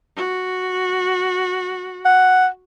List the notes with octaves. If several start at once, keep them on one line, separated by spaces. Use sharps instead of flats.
F#4
F#5